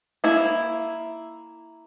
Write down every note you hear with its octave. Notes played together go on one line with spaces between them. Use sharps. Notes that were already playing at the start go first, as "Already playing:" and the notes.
A#3 E4